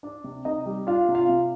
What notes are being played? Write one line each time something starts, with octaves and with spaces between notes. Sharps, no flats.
D4 D5
C3
C3 D#4 D#5
G3
D4 F4 F5
C3
F4 F5
C3